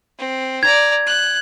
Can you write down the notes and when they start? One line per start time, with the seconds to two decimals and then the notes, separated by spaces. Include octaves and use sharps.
0.19 C4
0.63 D5 A#5 G#6
1.07 F#6